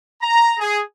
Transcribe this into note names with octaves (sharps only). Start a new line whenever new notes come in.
A#5
G#4